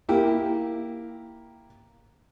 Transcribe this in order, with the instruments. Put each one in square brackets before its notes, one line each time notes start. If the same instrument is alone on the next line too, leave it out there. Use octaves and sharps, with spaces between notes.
[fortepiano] A#3 E4 G4